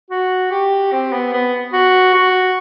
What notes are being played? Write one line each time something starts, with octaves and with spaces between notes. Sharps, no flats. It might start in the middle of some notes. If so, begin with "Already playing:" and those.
F#4
G4
C4
B3
B3
F#4
F#4